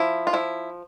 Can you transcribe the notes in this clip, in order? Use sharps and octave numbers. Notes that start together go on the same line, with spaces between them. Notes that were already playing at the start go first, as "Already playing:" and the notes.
Already playing: F3 E4
F4
F3 E4